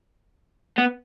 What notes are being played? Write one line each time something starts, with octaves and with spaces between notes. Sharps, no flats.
B3